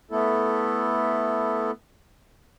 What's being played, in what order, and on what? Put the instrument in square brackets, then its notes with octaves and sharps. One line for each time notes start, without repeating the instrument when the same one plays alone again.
[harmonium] A3 B3 E4 A4